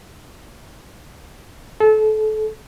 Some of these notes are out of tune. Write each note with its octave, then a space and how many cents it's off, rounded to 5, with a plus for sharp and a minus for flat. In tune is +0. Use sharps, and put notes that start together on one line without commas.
A4 -30